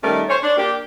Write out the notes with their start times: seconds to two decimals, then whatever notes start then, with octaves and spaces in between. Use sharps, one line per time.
0.02 D#3 G3 A3 C#4 A#4
0.28 C5 C#5
0.43 D4
0.58 A#3 D4 G4